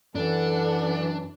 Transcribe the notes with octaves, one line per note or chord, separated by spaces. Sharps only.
F#2 E3 D4 A4 F#5